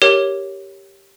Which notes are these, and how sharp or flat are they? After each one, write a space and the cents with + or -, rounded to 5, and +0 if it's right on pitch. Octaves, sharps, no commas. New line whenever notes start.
G4 +0 A#4 +0 C#5 +0